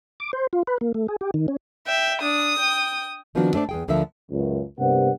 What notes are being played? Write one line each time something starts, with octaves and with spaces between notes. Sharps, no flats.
D6
C5
F4
B4
A#3
A3
G#4
G4
D#3
C#4
E5 G5
D4 D#6
G5
D#3 F3 B3 C4 D4 F#4
A3 D4 C5 D5
E2 G#4 G5
D2 D3 F3 A#4 E5
C#2 F#2
G2 C3 A#3 B3 F#5